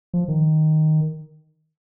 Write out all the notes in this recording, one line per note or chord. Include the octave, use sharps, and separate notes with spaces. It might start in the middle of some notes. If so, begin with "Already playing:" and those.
F3
D#3